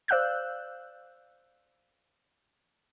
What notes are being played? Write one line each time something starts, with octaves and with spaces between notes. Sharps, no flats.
C5 D5 F5 E6 F#6 G6